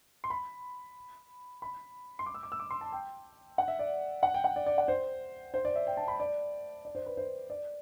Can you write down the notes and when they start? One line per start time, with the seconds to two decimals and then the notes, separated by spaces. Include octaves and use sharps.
0.24 C6
0.30 B5
1.62 B5
2.19 C6
2.26 D6
2.34 E6
2.43 D6
2.52 E6
2.60 D6
2.71 C6
2.81 A5
2.92 G5
3.58 F#5
3.68 E5
3.79 D5
4.23 F#5
4.34 G5
4.44 F#5
4.56 D5
4.66 D5
4.78 F#5
4.88 C5
5.54 C5
5.65 D5
5.76 E5
5.87 G5
5.97 A5
6.08 B5
6.20 D5
6.85 D5
6.95 C5
7.06 B4
7.17 C5
7.50 D5